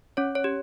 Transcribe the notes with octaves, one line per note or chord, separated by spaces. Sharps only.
C#4 C#5
C#5
G4